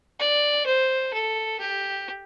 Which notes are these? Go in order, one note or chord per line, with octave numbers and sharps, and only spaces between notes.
D5
C5
A4
G4